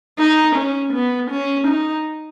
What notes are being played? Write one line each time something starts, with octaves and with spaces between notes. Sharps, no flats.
D#4
C#4
B3
C#4
D#4